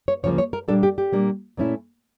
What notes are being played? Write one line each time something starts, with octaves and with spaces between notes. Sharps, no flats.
C#5
D2 C#3 F3 A#3 C#5
C#5
A#4
A#2 G3 A#3 D4 A4
G4
G4
A#2 G3 A#3 D4
A#2 A3 C#4 E4